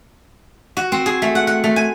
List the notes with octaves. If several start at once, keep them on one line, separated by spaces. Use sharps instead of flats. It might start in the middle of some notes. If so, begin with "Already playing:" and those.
F#4
C4
G#4
A3
F#5
F#5
A3
G#5